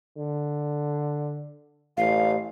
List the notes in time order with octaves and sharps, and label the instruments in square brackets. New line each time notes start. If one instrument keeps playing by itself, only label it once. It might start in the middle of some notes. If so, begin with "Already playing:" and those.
[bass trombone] D3
[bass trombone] A1 [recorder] F5